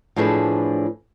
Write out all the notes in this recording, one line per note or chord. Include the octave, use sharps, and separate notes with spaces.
A2 F3 D4 G#4 B4 A5